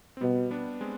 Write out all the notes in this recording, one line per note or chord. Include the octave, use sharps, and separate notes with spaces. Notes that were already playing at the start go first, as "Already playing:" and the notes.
C4
B2 G3 B3
B3 D4
G#3 C4